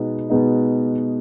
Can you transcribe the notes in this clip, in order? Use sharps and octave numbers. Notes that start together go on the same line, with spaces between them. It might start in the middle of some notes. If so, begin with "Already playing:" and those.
Already playing: B2 G#3 B3 D#4
B2 G#3 B3 D#4